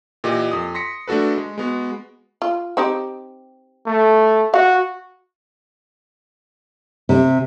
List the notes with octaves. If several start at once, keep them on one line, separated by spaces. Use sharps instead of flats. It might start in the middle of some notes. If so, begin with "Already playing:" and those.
A#2 E3 G4 D#5
F2 D#6
C6 A#6 B6 C#7
A3 D4 F#4 A4 B4
G#3
G#3 B3 F#4
F4
C4 D#4 G4
A3
F#4 F5
C3